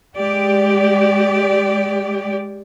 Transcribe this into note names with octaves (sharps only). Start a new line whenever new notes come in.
G#3 G4 D5